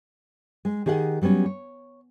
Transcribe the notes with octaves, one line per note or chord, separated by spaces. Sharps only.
G#3
D#3 G4 G#4 F5 F#5
F#3 G3 B3 C#4
C#5